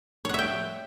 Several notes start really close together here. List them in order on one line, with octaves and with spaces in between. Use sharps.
C#5 F#5 E5 G5